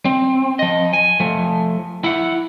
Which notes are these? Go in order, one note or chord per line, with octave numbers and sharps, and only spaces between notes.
C4
F3 D#5
G#5
F3 A3
E4 F#5